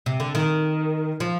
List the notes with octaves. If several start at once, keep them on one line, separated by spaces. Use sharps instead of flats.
C3
D3
D#3
F3